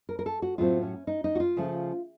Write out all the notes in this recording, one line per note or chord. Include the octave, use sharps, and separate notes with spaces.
A#4
A#4
A4
F#4
A2 F#3 A3 C4 F4
C#4
D#4
D#4
F#4
F4
C#3 F3 A3